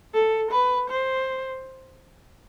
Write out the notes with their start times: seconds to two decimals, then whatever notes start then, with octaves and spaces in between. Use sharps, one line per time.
0.14 A4
0.51 B4
0.89 C5